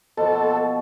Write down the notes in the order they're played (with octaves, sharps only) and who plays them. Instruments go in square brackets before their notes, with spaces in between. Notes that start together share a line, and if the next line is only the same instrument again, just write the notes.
[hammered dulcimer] B2 F3 [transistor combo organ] A4